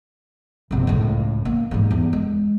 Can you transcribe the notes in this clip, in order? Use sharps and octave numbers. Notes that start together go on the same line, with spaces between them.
F#1 C3
C#2 A2
A#3
G#2 G3
E2
G#3